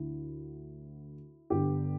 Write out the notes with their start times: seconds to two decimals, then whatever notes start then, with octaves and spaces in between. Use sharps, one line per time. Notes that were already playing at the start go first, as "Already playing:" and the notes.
Already playing: D2 D3 E4
1.50 G1 G2 D3 G4